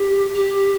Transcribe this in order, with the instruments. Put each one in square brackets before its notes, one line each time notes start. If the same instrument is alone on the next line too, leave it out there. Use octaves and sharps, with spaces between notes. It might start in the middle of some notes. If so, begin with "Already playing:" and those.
Already playing: [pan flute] G4
G4